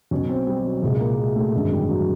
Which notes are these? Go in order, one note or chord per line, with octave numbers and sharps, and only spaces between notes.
B1 B2 C#4
C4
G3
F#3
C2 A#2 G#3
A#3
G#3
A3
G#1 F#2 D3 G#3
G3
F#3